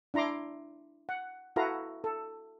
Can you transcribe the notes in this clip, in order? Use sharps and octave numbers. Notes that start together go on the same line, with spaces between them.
D4 E4 A#5 C6 D6
F#5
E4 F#4 A4 B4 F5 A#5
A4